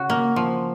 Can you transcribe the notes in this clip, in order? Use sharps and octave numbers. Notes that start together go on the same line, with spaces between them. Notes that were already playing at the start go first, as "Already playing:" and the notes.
Already playing: C#3 F#4
A#3
F3